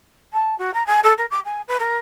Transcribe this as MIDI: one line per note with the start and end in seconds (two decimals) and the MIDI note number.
0.33 0.57 81
0.58 0.71 66
0.74 0.85 82
0.87 1.00 80
1.04 1.13 69
1.18 1.26 70
1.31 1.40 86
1.45 1.62 80
1.68 1.77 71
1.80 1.97 70